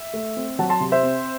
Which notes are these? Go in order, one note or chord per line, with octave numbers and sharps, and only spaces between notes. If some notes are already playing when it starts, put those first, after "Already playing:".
Already playing: E5
A3
C4
F#3 F#5 A5
A5 C6
C3
C5 E5
C4